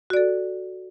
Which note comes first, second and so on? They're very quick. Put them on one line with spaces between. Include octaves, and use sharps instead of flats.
F#4 D5 A4